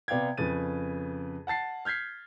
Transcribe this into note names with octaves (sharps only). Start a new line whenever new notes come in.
C3 B3 D5 F5 G5 G#6
F2 C#3 B4 A6 D#7
F#5 A5 A6 C7
F6 G6 G#6 B6 C7